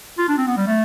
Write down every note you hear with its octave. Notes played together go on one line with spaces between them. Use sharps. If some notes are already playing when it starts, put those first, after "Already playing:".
F4
D4
C4
B3
G3
A3